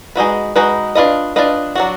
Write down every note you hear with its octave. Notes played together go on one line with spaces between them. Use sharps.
G#3 D#4 F#4 B4
G#3 D#4 F#4 B4
D4 F4 B4 D#5
D4 F4 B4 D#5
F#3 D4 F#4